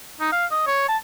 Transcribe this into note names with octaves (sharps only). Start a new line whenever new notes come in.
D#4
F5
D#5
C#5
A5